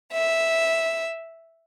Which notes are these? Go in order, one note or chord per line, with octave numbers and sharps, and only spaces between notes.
E5